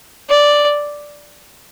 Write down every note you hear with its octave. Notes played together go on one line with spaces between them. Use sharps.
D5